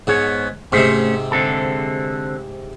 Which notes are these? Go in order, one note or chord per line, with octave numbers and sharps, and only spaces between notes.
G#2 B3 C#5
G#2 C3 A3 C#4 C5
D3 C4 A4